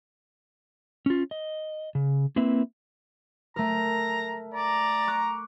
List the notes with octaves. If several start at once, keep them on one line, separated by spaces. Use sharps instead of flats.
C#4 F4
D#5
C#3
A#3 C4 E4 B4 E5
A3 A#4 A#5
D5 A#5
C#6 D6 F#6